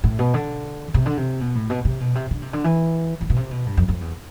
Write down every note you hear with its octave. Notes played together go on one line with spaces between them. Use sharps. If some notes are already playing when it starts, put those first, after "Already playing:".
A2
B2
D3
C3
D3
C3
B2
A2
B2
C3
B2
C3
D3
C3
D3
E3
E3
B2
C3
B2
G2
F2
F2
E2